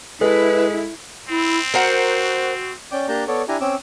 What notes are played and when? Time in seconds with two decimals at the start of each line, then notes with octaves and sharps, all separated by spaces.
0.21 G#3 E4 A4 B4
1.29 C4 E4
1.74 F#4 A#4 C5 F#5
2.91 C#4 D5 G5 D6
3.09 A#3 D4 G4 A5 A#5 G6
3.28 B3 A4 C#5 D5
3.48 D4 E4 G4 G#5 A#5
3.61 C4 C#4 D6 E6